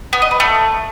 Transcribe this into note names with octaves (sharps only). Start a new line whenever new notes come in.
B3
D#5
B4
A3